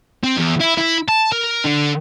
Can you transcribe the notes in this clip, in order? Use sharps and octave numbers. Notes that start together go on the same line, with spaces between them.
C4
E2
E4
E4
A5
A#4
D3